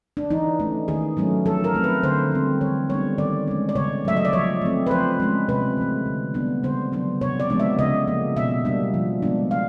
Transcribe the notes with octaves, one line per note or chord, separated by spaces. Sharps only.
D4
E3 D#4
A3 C#4
D#3 G#4
F#3 A3 C#4
F3 A4
A#4
A3 C4
B4
D3 C5
G3 C4
E3 C#5
G3 B3 D4 C#5
D#3 D5
G#3 C#4
D5
C#3 C#5
F#3 A3 E5
D#5
D5
F3 C#5
A3 C4
B4
F3 C5
G#3 C#4
C3 B4
E3 A3
D3
G3 B3 D4
C#3 C5
F#3 B3 D4
C3 C#5
D5
F3 G#3 B3 D4
E5
C#3 D#5
F3 A#3
B2 E5
G3 A#3 D4
F3
G#3 B3 D4
F3 F5